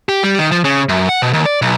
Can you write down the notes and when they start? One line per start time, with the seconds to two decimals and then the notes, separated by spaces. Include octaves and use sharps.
0.09 G4
0.24 G3
0.39 D#3
0.52 F3
0.64 C#3
0.89 F#2
1.09 F#5
1.22 B2
1.33 D#2
1.46 D5
1.62 B1